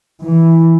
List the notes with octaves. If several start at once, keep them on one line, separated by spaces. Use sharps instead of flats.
E3